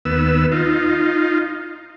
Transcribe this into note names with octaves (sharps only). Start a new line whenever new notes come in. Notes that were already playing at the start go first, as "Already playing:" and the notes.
D#2 B3 E6
D#4 F4